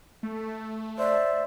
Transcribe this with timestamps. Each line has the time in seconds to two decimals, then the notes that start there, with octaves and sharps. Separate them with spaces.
0.23 A3
0.99 C5 D5 E5